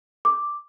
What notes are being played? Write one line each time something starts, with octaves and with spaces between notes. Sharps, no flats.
D6